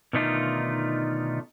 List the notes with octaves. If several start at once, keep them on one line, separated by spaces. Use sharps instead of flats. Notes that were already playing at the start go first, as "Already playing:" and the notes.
B2 D3 D#3 A3 D#4 F4